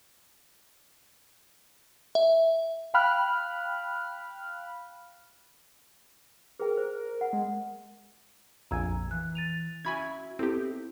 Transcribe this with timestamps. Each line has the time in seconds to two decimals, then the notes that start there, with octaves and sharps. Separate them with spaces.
2.15 E5
2.94 F5 G5 B5 F6 F#6
6.60 G#4 A#4 B4 G5
6.77 C5
7.21 F#5
7.33 G#3
8.71 A#1 F2 F5 G#5 A#5 E6 G#6
9.11 E3 F#6
9.35 A6 D#7 F7
9.85 C#4 E4 F#4 G#5 B5 G#6
10.39 B3 C4 D#4 E4 G4 A4